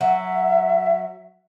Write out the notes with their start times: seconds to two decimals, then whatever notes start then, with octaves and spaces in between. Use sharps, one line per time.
0.01 F#3 E5